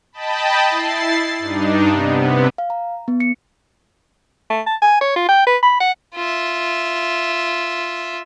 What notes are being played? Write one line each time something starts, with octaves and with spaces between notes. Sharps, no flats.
D#5 G5 A5 B5
E4 A6 C7
G2 D4 D#4
C3 B3
F5
A#5
B3
C#7
A3
A5
G#5
C#5
F4
G5
B4
B5
F#5
F4 E5